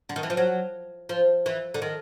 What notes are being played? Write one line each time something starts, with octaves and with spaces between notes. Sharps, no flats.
D3
D#3
E3
F3
F#3
F3
E3
D3
D#3